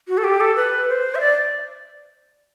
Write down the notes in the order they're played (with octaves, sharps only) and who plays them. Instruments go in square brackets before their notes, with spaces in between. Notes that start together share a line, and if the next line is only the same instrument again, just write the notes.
[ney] F#4
A4
G4
A4
B4
C5
E5
D5